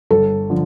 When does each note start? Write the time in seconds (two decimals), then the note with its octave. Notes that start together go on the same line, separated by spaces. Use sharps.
0.11 G1 A4
0.50 D3 F3